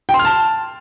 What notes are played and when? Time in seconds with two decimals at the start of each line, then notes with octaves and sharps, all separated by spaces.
0.09 G5
0.14 C6
0.19 F6
0.25 A5